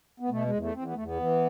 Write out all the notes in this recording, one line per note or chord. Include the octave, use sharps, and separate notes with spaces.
B3
B2 A3
G#3
E2
A3
E2 C4
B3
E2 A3
B3
E3